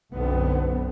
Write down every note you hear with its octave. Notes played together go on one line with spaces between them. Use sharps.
B1 F#2 D3 B3 C4